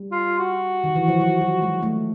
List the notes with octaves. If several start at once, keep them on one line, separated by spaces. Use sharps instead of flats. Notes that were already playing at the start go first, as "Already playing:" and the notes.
Already playing: G3
F4
F#4
D#3
E3
F3
F#3
F#3
G#3
A3